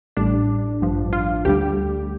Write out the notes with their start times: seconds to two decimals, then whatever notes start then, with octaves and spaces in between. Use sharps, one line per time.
0.17 A1 A2 G3 D4
0.81 A1 G2 F3
1.13 F4
1.45 D2 D3 G3 G4